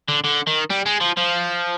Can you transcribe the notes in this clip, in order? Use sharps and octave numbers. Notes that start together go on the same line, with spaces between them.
D3
D3
D#3
G3
G#3
F3
F3